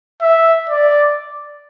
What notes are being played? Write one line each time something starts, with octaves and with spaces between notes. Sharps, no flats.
E5
D5